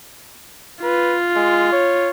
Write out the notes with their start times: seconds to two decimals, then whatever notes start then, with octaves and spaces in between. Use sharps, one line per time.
0.83 F4 B4
1.35 G#3
1.72 C#5